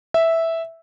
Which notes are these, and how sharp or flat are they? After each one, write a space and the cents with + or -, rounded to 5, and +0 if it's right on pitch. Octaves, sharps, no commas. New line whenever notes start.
E5 -5